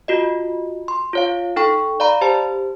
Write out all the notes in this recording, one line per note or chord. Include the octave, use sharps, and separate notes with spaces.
F4 F#4 D#5
C6
F4 C#5 F5
D#4 A4 G5 C#6
D5 F5 A#5 B5
G4 C5 A5